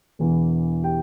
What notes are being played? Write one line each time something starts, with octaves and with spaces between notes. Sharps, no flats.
E1 E2 E3
G4 G5